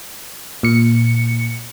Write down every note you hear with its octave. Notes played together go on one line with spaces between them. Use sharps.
A#2 C#7